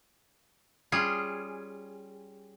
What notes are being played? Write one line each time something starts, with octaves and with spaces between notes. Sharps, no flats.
G3 C#4 F4 G#4